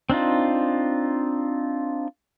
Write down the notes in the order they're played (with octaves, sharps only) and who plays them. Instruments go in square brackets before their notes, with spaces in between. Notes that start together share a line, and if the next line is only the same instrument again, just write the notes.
[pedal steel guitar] C4 D4 D#4 F4